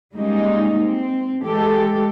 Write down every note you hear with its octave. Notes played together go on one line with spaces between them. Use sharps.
G3 G#3 A#3 C#4 D#4
C4
E3 G#3 G4 A4